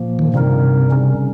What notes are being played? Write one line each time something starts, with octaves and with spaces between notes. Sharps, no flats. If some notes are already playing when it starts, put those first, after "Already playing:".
Already playing: A#2 F3 A#3
D#3
G2 C3 G3 C4 D#4 A#4
C#3 G3 C#4